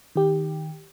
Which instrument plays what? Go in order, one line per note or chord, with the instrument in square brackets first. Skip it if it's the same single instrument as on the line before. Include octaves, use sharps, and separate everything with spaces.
[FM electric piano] D#3 G4